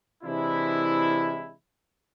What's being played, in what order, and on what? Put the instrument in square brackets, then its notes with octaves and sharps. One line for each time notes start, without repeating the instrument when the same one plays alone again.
[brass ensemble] C3 E3 G#3 D4 E4